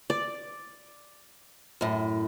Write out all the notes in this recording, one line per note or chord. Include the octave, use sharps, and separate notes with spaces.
D5
F#2 A2